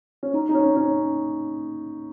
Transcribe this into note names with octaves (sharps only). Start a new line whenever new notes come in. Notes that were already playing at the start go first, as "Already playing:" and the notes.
C#4
D#4
D#4
C#4
C#4